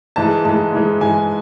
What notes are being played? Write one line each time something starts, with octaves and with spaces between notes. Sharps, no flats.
G#2 E3 G#3 A5
G#2 E3 G#3 A5
G#2 E3 G#3
G#2 E3 G#3 G#5